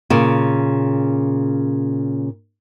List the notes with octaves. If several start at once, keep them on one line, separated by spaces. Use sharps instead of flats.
A#2 C#3